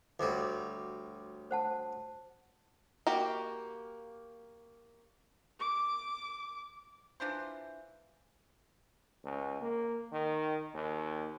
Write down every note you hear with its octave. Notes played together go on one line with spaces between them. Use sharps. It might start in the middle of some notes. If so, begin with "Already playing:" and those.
D2 F#3 G3 D6
C5 F#5 A5
A#3 F#4 G4
D6
E3 D4 F4 C5
C#2
A#3
D#3
D#2